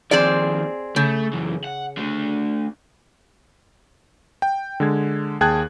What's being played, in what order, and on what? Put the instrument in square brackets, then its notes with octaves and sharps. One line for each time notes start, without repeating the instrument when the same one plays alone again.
[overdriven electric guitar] D#2 F3 [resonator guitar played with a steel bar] C4 G#4 D5
[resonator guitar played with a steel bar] C#3 [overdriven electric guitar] A3
[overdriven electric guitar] F#2 E3
F#5
A3 D4
[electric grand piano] G5
D3 G#3 G#6
D#2 G#4 G5 A5 F#6 G#6